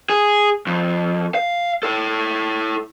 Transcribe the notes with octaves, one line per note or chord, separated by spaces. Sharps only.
G#4
F2
F5
E4 A4